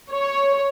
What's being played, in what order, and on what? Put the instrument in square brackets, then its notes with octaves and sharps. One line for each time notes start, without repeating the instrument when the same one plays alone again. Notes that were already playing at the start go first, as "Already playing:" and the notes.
[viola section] C#5